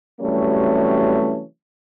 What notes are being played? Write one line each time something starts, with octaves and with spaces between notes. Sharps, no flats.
C3 E3 F#3 G3 A3 C#4